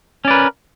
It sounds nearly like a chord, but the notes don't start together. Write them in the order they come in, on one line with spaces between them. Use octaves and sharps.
C#4 D5 B4 A#4